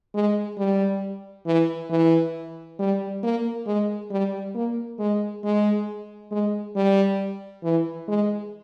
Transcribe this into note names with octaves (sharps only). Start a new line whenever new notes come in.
G#3
G3
E3
E3
G3
A#3
G#3
G3
A#3
G#3
G#3
G#3
G3
E3
G#3